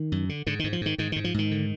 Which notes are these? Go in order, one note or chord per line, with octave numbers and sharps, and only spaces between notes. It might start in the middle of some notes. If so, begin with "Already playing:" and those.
Already playing: D#3
F#2
D3
G#2 D3
D#3
G#2
F3
G#2 D#3
G#2 D#3
G#2 D#3
F3
G#2 D#3
D3